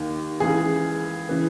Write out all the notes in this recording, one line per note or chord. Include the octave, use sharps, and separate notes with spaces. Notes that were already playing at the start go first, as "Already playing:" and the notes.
Already playing: D#2 D#3
C#2 C#3 E3 G#4
C#3 E3